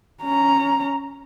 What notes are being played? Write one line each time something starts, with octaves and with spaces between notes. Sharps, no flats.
C#4 A#5